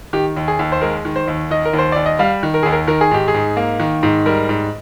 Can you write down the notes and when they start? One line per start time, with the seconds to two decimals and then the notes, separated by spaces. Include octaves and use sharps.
0.13 D#3 G4
0.37 D#2
0.48 G#4
0.59 D#2
0.72 C5
0.81 G#3 A#4
1.05 D#3
1.16 C5
1.28 D#2
1.51 D#3 D#5
1.65 A#4
1.73 D#2
1.79 C5
1.92 D#2 D5
2.06 D#5
2.19 G3 F5
2.43 D#3
2.54 A#4
2.63 D#2 G#4
2.72 A#4
2.87 D#3 A#4
3.01 G#4
3.11 G#2 G4
3.28 G#4
3.34 G#2
3.57 A#3
3.80 D#3
4.03 G#2
4.26 G3 A#4
4.49 G#2